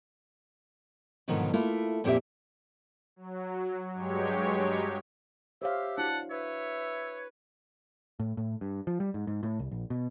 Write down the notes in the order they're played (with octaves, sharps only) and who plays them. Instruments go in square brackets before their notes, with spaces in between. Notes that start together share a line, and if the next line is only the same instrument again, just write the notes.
[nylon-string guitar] G#2 B2 D3 D#3 F3 F#3
A3 A#3 E4 F4
F2 A#2 G#3 C4 G4 E5
[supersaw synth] F#3
G2 F#3 G#3 G4 C#5
[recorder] G4 [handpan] C5 C#5 F5 [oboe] E5
[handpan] D4 E4 F#4 [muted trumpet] F#5 [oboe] A5
[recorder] B4 [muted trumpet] C#5 [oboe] E5
[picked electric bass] A2
A2
G2
F3
G3
G#2
G#2
A2
C2
A#1
B2